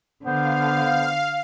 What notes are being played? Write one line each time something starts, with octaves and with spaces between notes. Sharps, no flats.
D3 B3 C5 F5